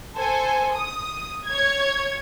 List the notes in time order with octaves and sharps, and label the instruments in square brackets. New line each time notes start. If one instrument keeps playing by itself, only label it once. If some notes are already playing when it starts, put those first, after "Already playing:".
[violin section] A4 C5 G#5
D#6
C#5 G#6